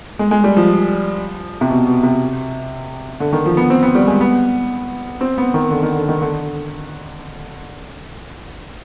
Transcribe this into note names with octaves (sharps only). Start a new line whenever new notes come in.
G#3
G#3
G3
F3
C3
B2
B2
C3
D3
D#3
F3
B3
C4
B3
G3
G#3
B3
C4
B3
D#3
D3
D#3
D3
D#3
D3